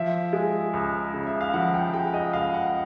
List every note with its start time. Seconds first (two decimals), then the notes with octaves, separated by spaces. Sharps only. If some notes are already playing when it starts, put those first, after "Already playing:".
Already playing: F3 E5
0.33 G#3
0.73 C#2
1.14 C#3
1.27 E5
1.41 F5
1.53 F3 F#5
1.74 G5
1.94 G#3 G5
2.14 D#5
2.33 C#2 F5
2.54 F#5